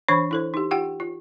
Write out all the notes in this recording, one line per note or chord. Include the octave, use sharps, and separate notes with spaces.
E3 D4 C5 C#5 B5 C#6
E4 A4 C5
D#4 G4
F4 G4 F#5 G5
F4